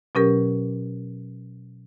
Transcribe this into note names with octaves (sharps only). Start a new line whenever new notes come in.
B2 F#3 C#4 G4 A#4